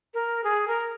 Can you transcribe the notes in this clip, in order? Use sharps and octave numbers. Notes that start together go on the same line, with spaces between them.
A#4
G#4
A#4